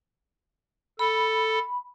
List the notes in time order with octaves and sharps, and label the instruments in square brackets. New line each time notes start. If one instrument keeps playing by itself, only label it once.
[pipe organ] A4 [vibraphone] B5